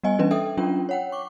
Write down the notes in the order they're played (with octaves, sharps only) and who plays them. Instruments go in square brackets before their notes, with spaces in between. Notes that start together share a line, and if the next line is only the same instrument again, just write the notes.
[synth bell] G3 B3 D#5 G#5
E3 G3 C#4 D4 B4 D#5
A4 E5 G5 D#6
F#3 C#4 D4 F4 G5
C#5 F#5 G5
C#6 D6